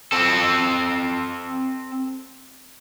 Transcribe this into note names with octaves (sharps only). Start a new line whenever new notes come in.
C4 A4